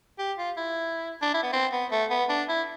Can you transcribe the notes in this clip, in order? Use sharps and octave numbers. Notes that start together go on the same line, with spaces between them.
G4
F4
E4
D4
E4
B3
C4
B3
A3
B3
D4
E4